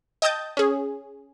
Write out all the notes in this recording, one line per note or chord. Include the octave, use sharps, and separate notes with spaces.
D#5 G5 A5 D#6 G6 A6
C#4 G#4